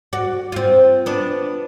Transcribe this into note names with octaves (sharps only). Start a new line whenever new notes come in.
F#4 D5
C4 F4
B3 D4